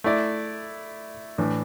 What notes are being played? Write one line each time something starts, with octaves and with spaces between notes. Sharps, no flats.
A3 E4 D5
A2 E3 D4